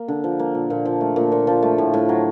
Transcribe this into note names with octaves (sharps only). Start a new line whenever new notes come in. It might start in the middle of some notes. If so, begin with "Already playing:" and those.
Already playing: A#3
D3
F3
A#3
A#2
A#2
F3
A3
A#2
A#2
F3
A3
A2
A2
F#3